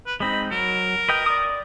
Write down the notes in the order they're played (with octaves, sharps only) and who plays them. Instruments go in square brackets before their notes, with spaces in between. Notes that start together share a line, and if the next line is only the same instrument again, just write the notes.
[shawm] B4
[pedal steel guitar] G#3 C4 D#4 [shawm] B5
[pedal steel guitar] F#3 [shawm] A#4
[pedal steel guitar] B4 D#5 G5
D5 D#6